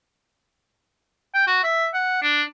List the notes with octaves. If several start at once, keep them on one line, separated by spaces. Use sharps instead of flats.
G5
F#4
E5
F#5
D4